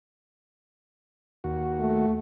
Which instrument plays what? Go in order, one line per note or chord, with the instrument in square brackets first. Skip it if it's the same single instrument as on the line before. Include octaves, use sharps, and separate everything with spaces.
[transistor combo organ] D#2 F#4
[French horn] A3